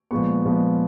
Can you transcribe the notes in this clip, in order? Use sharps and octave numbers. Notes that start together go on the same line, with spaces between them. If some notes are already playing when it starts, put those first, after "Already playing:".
A#2 F3 G#3 B3 C#6
A#2 F3 G#3 B3